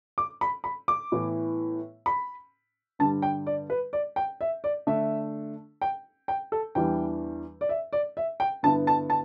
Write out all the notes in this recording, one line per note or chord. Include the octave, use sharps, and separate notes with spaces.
D6
B5
B5
D6
A2 E3 B3 E4
B5
G2 D3 G3 A5
G5
D5
B4
D5
G5
E5
D5
D3 A3 D4 E5
G5
G5
A4
E2 E3 G3 D4 G5
D5
E5
D5
E5
G5
G2 D3 B3 E4 A5
A5
A5